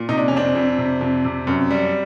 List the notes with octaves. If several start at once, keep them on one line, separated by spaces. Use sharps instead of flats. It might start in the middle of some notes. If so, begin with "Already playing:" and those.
Already playing: A#2
C3 D#4
D4
F2 C#4
C4 D4
F2
C3
F2
C3
F#2
G3